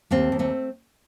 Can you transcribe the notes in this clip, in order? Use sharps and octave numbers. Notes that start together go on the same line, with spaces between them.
D#2 A3 C4
D#2
A3 C4